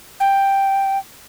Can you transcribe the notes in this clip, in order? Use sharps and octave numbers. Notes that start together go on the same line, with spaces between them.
G5